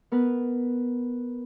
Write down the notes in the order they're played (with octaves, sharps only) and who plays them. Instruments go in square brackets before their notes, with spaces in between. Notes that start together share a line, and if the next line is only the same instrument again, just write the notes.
[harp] B3 A#4 B4